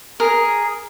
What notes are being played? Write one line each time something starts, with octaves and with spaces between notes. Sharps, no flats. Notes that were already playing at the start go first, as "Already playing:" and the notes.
G#4 A#4